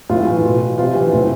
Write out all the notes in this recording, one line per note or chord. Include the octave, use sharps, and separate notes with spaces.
A2 F4
E3
B2
C3 F4
E3
A2